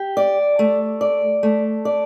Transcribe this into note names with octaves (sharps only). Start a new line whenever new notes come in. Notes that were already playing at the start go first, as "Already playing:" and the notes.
Already playing: G4
D5
A3
D5
A3
D5